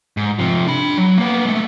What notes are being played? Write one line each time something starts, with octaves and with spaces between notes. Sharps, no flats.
G#2
C3 F3
D4 B5
F#3
A#3 B3
G#3 A3